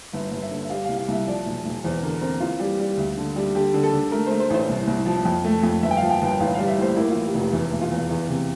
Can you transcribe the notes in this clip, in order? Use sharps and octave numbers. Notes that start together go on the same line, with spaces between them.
G1 E5
G1
E5
D3
E5
G3 F5
C2 F5
F5
C2 E5
F3 D5
E1
E1
E2 C5
D3 A#4
C4 A#4
E3 F4
G3
G3
D2
D3
G3
D3 G4
D3
A4
D3
A3 A#4
C5
A3
C5
A1 C5
C2
C2
F3
F2
A3
F2
G1 E5
G5
F5
F3
G5
G1 G5
A1 F5
G3 F5
E5
A2 C5
A#3 E4
E3 F4
G4
F1
F4
E2 E4
E1
F4
E2
E2
C3